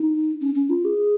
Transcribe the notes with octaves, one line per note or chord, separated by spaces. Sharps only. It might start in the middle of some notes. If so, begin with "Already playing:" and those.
Already playing: D#4
C#4
C#4
F4
G#4